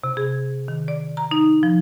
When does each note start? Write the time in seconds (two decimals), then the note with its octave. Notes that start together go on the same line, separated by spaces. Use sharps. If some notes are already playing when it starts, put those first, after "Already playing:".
0.04 C3
0.17 G#4
0.68 D#3
0.88 D5
1.17 A#5
1.31 D#4
1.63 F3